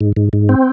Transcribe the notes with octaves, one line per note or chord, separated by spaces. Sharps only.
G#2
G#2
G#2
C4